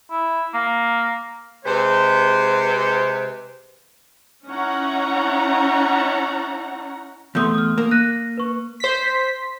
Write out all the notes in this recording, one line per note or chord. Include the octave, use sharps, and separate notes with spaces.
E4
A#3
C3 G#3 B4 C5
C#4 D#4 E4 C#5 F#5 A#5
E2 A3 C6 D#6 G6
D#6 F6
A#3
F#6 A#6 D#7
B4 C#6
C5 B6